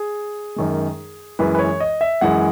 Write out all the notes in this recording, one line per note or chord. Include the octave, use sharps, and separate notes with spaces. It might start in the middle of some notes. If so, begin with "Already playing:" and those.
Already playing: G#4
F#2 D#3 G#3
F#2 E3 G#3 B4
B4
C#5
D#5
E5
F#2 E3 G#3 F#5